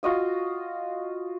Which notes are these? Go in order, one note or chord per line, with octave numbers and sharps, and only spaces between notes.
F4 F#4 D#5 G5